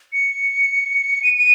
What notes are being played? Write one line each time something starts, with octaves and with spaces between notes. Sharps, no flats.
C#7
D#7
D#7